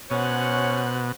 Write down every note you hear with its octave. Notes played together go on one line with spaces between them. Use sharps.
B2 C#4 C5 C#5 F#5